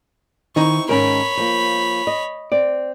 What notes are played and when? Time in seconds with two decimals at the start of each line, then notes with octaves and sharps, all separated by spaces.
0.56 D#3 C4 D#4 E4 C#6
0.89 G#2 D#3 C#4 A#4 C#5 B5
1.37 F3 A#3
2.07 D#5
2.52 C4 D5